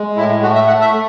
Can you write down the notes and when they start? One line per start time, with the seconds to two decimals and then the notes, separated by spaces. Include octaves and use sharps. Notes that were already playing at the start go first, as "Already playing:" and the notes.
Already playing: G#3
0.16 A2 E4
0.43 A3 F#4
0.55 E5
0.67 A3 F#5
0.81 E5
0.93 A3